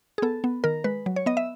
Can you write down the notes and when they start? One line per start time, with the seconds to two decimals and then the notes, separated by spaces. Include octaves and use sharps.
0.18 G#4
0.22 B3 A4
0.44 B3
0.64 D#3 A#4
0.84 G#3 B4
1.06 F#3
1.16 C#5
1.26 B3 D#5
1.37 E5